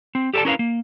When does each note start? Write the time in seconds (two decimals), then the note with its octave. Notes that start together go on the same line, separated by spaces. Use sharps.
0.15 C4
0.34 G4 A4 B4 D5 A5
0.45 C#4 E4 A#4 B4 E5 F5
0.59 A#3